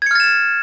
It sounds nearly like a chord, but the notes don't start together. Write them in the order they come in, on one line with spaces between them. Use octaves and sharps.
G#6 C#7 F6 A6 E7